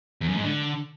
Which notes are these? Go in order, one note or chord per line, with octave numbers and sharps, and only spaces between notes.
E2
F#2
G#2
D3